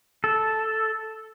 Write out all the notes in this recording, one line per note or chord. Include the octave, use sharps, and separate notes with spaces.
A4